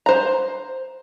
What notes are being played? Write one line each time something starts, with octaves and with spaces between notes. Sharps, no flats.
C5 A#5